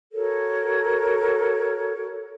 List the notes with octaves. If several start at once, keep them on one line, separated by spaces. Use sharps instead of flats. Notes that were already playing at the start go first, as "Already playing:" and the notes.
F#4 A4 A#4 C#5